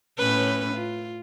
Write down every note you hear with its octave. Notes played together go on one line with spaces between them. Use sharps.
A2 C#4 B4
F4